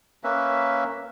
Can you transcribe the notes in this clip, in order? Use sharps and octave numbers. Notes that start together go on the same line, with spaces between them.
A#3 C#4 B4 E5